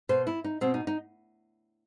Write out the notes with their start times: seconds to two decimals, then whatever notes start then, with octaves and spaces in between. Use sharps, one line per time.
0.09 B2 C5
0.27 E4
0.44 D#4
0.61 B2 C4
0.74 D#4
0.87 D#4